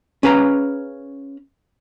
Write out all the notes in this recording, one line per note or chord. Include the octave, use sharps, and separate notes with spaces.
C#4 G#4 B4 F5 A#5